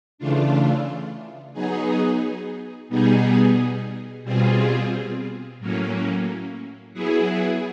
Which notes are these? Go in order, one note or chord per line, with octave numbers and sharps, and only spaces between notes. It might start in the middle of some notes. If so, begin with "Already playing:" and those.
C#3 E3 A3 D4 F4
F#3 B3 D#4 G#4
B2 G3 B3 D#4 G#4
B2 G3 C4 F4 G#4
A2 F#3 A#3 C#4
F#3 B3 E4 G#4